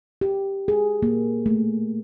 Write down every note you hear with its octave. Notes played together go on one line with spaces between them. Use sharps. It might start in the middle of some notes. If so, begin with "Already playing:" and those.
G4
G#4
A#3
A3